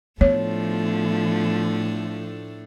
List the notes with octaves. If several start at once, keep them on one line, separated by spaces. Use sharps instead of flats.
A2 F3 A3 B3 D4 C#5